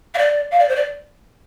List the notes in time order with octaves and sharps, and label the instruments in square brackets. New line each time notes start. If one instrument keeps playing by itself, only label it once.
[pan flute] F5
D5
F5
D5
C5
D5